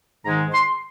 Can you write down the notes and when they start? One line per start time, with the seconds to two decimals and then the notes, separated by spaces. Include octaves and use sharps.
0.25 G#2 D#3 G#3 A#5
0.52 C6